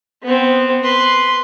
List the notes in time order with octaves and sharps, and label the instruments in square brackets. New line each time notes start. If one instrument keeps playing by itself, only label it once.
[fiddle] B3 C4
B4 C6